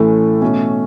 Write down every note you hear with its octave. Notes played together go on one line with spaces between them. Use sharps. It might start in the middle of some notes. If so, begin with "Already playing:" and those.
Already playing: A2 E3 A3 C#4 A4
B2 A3 C#4